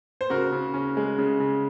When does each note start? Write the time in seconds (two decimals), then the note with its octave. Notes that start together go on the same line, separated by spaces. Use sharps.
0.21 C5
0.30 C#3 F#4 A#4
0.52 C#3
0.74 C#4
0.97 G#3
1.18 C#3
1.40 C#3